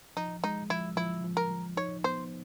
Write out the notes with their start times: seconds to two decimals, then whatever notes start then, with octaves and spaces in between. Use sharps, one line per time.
0.17 F3 D#4
0.44 G#3 D#4
0.70 F3 E4
0.97 F3 E4
1.24 F3
1.37 A#4
1.51 F3
1.77 D#4 C#5
2.04 B3 C5